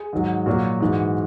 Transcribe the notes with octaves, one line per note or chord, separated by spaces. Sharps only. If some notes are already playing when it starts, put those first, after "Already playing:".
Already playing: G#4
G#2 D#3 F#3
A#2 F#3 F#4
G#2 E3